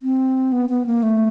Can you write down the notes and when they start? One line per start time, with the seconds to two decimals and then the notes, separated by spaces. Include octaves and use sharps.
0.03 C4
0.52 B3
0.69 B3
0.86 A#3
1.03 A3